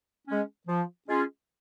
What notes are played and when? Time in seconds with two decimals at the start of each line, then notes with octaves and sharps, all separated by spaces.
0.27 G#3 C#4
0.68 F3
1.08 G#3 C#4 F4 G#4